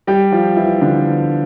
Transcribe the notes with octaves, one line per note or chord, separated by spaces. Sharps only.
G3 G4
F3 F4
E3 E4
D3 D4
B3